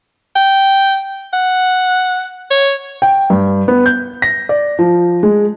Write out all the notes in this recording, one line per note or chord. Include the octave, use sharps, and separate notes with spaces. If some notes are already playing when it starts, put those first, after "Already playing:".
G5
F#5
C#5
G5
G2
B3
G6
A#6
D5
F3
G#3